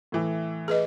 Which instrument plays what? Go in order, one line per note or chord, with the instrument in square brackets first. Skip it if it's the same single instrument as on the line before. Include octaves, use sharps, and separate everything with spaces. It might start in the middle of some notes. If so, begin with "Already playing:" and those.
[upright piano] A2 E3
[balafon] G#4 B4 D#5